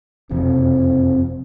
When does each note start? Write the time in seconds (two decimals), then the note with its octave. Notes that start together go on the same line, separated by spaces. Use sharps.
0.31 F#1 F2 C3 C4